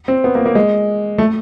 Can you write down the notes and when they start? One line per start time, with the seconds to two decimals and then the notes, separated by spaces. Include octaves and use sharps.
0.08 C4
0.24 B3
0.35 A#3
0.46 A#3
0.55 G#3
1.18 A3